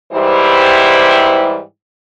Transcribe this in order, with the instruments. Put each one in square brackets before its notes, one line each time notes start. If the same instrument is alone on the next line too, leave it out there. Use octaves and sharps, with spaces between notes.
[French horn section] G#2 E3 G3 E4 G4 C5